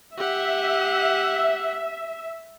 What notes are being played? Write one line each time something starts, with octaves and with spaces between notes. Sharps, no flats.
G4 E5 F#5